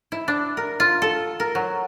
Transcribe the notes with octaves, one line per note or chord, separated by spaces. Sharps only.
E4
D4
A#4
F4
A4
A#4
F#3